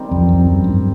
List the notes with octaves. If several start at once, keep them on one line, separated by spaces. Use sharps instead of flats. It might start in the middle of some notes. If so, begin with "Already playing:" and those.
Already playing: D#3 G3 C4
F2
F2
F#2
G2